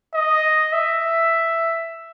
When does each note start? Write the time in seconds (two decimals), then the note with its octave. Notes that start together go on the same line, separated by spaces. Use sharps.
0.15 D#5
0.73 E5